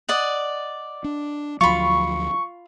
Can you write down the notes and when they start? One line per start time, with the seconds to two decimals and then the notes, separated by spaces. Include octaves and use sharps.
0.09 D5 D#5 F#5
1.04 D4
1.61 D2 F3 F#3 F4 B5 C#6